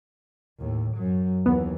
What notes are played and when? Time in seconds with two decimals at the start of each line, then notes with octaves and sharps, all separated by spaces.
0.59 D#2 A2
0.97 F#2 F#3
1.46 D#2 E3 B3